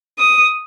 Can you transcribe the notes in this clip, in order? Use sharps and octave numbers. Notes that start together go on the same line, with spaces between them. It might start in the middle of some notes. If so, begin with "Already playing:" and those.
D#6